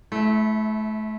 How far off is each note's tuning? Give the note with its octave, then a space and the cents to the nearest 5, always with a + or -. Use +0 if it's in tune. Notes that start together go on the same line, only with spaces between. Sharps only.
A3 -30 E4 +0